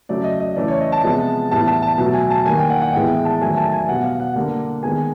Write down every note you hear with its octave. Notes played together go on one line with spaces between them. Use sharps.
C#3 F#3 A3 D5
D#5
D#5
C#3 E3 A3 D5
C#5
D#5
A5
C3 F3 G#3 B3
A2 E3 G3 B3 A5
A5
A5
B2 F#3 A3 A5
G#5
A5
D#3 G3 A#3 G#5
G5
F#5
F#5
A2 E3 G#3 B3 G5
A5
D#3 F#3 A3 G#5
A5
G#5
B2 G3 B3 F#5
F5
F#5
D3 G3 A#3
D#3 G#3 B3 G#5